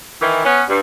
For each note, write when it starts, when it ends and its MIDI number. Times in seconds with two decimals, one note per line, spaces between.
0.21 0.41 51
0.21 0.41 52
0.45 0.62 59
0.45 0.62 61
0.68 0.79 43